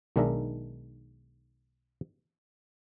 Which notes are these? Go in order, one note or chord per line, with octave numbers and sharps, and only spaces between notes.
B1 D#3 G#3 D4 A#4 E5